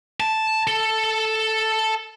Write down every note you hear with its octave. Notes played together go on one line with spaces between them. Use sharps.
A5
A4